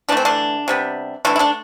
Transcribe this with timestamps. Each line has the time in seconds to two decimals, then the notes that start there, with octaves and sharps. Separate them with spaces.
0.09 E3 D4
0.12 A3 C4
0.25 D3 D4
0.68 C3 G3 B3
1.25 D3 E3 A3 E4
1.36 E4
1.39 D3 D4